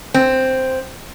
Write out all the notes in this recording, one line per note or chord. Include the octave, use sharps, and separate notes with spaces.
C4